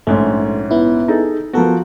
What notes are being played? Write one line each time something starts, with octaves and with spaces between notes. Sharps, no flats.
A#1 G#2 A3 C#4
B3 E4
D#4 G#4 A4
F3 B3 F#4 A4 A#4